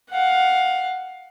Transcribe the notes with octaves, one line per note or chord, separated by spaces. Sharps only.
F5 F#5